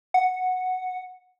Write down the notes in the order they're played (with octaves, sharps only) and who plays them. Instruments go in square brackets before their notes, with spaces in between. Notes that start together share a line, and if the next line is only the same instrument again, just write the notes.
[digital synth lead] F#5